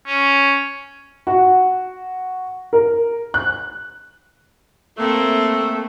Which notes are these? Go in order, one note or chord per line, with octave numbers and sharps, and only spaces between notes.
C#4
F#4
A#4
F#6
A3 A#3 C4